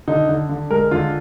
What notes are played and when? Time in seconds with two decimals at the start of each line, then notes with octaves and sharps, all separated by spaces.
0.08 D3 D#4
0.29 D3
0.49 D3
0.70 G#3 A#4
0.91 D3 F4